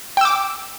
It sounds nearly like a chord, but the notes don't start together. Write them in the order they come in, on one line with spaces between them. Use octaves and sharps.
G5 E6 D6